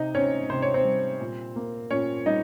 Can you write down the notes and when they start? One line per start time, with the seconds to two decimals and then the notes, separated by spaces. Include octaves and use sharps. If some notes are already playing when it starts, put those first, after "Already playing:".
Already playing: C3 D#4 D#5
0.15 C4 C#4 C#5
0.50 C3 C5
0.62 C#5
0.74 C4 C5
0.85 G3
1.20 A#2
1.56 A#3
1.91 A#2 C#4 C#5
2.26 G3 D#4 D#5